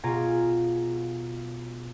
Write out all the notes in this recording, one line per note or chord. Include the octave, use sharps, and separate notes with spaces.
B2 F4 G#4 A#5 G#6 D7